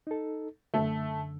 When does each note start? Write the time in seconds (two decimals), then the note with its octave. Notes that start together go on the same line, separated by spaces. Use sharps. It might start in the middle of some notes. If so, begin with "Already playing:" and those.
0.07 D#4 A4
0.74 F#2 D3 A3